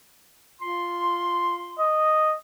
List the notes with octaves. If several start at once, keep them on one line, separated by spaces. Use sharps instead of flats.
F4 C6
D#5